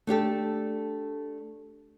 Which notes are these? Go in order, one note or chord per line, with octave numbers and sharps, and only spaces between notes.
A3 D4 G4 A4